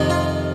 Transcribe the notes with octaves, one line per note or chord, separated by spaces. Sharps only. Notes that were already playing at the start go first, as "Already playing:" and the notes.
Already playing: F2 C3 D#3
F4